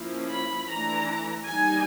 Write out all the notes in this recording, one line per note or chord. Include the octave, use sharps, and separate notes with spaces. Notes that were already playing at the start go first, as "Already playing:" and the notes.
Already playing: F3 A#3 C#4 E4
B5
E3 A3 D4 A#5
G3 A#3 D#4 G#5